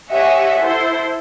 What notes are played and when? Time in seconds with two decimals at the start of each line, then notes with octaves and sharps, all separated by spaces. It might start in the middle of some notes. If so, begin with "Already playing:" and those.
0.11 G4 C#5 D#5 E5 F#5 G#5
0.60 E4 A4 C5